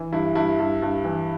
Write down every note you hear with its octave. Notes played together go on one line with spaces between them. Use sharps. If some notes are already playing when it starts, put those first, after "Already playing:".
Already playing: E3
G2 E4
G2 E4
G2
G2
E3